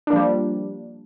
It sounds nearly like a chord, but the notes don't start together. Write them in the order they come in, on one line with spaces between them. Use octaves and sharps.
D4 A#3 F3 G3